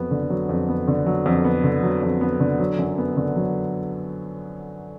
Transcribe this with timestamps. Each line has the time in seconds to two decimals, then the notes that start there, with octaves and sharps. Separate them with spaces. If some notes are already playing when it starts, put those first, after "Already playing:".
Already playing: F2 F#3 B3
0.11 D3
0.30 F#3
0.49 F2
0.69 B3
0.88 D3
1.06 F#3
1.26 F2
1.45 B3
1.64 D3
1.83 F#3
2.03 F2
2.21 B3
2.40 D3
2.60 F#3
2.79 F#2
2.98 B3
3.17 D3
3.36 F#3